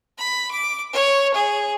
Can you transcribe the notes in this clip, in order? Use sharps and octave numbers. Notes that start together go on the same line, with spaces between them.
B5
D6
C#5
G#4